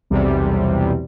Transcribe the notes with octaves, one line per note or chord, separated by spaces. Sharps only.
B1 E2 C3 G3